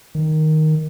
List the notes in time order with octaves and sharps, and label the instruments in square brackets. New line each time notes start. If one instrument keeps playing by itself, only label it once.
[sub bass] D#3